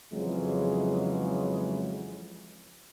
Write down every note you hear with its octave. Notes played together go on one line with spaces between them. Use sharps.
F2 C#3 E3 F#3 G#3